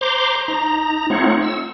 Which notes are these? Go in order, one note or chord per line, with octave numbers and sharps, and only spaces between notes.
C5 A#5 C6 D6
D#4 A#5
A3 C4 D#4 F4 C#5 F#5
E6